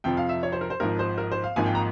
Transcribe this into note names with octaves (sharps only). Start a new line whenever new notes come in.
F2 C3 F3 G5
F5
E5
C#5
C5
A#4
C5
G#1 G#2 F3 A#4
C5
A#4
C5
F5
G#1 G#2 F3 A#3 G#5
G5
A#5